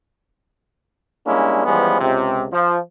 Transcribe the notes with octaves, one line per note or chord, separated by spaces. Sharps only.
G3 G#3 A#3 C#4 D4 E4
E3 F3 G3 G#3 B3 C#4
C#2 C3
F3